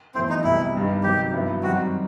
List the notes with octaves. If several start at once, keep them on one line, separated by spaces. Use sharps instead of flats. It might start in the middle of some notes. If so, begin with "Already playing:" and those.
E2 B2 F#3 A3 C4 E4
D#4
C2 B2 G3 C4 E4
G2 D#3 G3 B3
C3 D#3 F#3 G4
G2 F#3 B3 E4
F#2 D#3 G3 C4 F#4